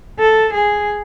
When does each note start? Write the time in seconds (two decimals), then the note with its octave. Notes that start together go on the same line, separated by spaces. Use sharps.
0.19 A4
0.53 G#4